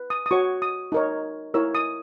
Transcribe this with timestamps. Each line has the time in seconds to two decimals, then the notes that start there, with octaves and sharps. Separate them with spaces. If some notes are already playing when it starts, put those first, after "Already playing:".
Already playing: B4
0.10 D#6
0.26 D#6
0.31 F#4 C#5 C#6
0.62 D#6
0.92 D#4 A#4 C#5
1.54 E4 A#4 C#5 E6
1.75 D#6